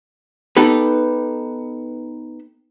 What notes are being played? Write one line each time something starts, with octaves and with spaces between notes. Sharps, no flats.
B3 D#4 G4 A4 B4